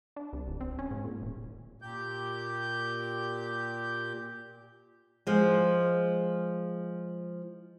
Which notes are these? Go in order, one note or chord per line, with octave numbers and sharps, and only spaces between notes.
D4
C2
D1
C4
C#4
G#2
A#2
D#1
A#2 G4 G6
F3 G#3